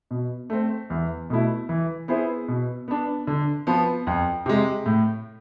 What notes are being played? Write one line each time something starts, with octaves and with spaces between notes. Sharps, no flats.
B2
A3 C4
E2
B2 A3 E4
E3
B3 E4 G#4 C5
B2
B3 D4
D3
F3 B3
F2
C3 G#3
A2